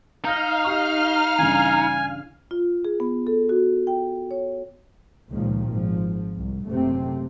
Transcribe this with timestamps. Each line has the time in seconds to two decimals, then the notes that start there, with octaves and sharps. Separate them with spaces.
0.25 D#4 F5 D#6 F6 G6 A#6
0.64 G4 C#6
1.38 G2 C#3 E3 G#5
2.51 F4
2.85 G#4
3.00 B3
3.27 A4
3.49 F#4
3.87 G5
4.31 C#5
5.30 C#2 A#2 D#3 F3
5.70 G#1 F3
6.35 C2
6.66 F#1 C3 A3 C4